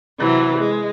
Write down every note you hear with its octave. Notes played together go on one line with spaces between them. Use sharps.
C3 E3 F#3
G#3